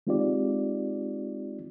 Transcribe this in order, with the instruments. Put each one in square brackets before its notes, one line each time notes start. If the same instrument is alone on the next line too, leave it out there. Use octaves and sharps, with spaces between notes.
[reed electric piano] G#3 C4 D#4 F4 G4 D5